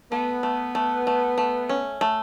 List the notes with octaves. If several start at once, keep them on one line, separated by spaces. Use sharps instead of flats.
A3 B3
A3
A3
A3
A3
C#4
A3